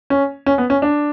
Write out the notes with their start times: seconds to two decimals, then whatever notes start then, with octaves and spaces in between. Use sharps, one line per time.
0.10 C#4
0.46 C#4
0.58 B3
0.70 C#4
0.82 D4